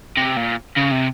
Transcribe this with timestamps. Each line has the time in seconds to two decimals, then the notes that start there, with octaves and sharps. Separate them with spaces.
0.17 C3
0.37 A#2
0.77 C#3
0.92 C3